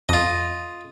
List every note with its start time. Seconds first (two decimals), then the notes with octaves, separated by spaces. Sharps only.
0.09 F2 F4 D#5